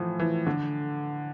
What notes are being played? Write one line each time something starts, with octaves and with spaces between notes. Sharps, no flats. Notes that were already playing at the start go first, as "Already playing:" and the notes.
Already playing: A2 E3 F3
E3
D3